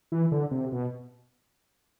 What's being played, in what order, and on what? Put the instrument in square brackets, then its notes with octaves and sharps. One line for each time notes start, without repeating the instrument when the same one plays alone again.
[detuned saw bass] E3
D3
C3
B2